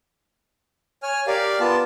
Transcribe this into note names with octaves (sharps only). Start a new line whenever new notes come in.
C#5 G#5 F6
G4 A#4 D5 F5
B3 F4 A5